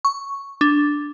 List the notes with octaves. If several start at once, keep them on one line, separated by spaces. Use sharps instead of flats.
C#6
D4